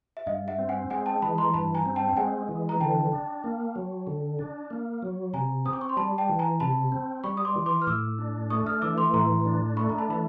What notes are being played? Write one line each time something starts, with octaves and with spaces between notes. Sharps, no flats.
E5
G2 D#5 F5
E5 F#5
C4
F#5 G#5
G#3 F#5 G#5
G5 A5
E3 A5 B5
A#5 C6
G2 A5 B5
G#5 A#5
C4
G5 A5
G5
G#3 F#5 G#5
E3
A#5
D3 G5 A5
D4
A#3
F#3
D3
D4
A#3
F#3
C3 G#5 A#5
C4 D#6
D6
C#6
C6
G3 A5 B5
G5 A5
E3
G#5 A#5
C3 A5 B5
C4
G3 B5 C#6
D#6
C6 D6
E3
C6 D6
F6
A2 D6 E6
D4
A3 C#6 D#6
D#6 F6
E3 D6 E6
C6 D6
A2 A#5 C6
D4
A3 B5 C#6
A#5
A5 B5
E3 B5